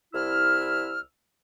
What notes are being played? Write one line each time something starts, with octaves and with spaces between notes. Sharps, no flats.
C2 E4 E6 F6